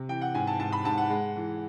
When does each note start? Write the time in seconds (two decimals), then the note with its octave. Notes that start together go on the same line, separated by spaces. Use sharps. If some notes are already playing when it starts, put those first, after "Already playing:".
Already playing: C3
0.09 E3 G5
0.21 F#5
0.35 G#2 G#5
0.47 A5
0.60 G#2 A5
0.73 B5
0.85 G#2 A5
0.98 F#5
1.10 G#3
1.36 E3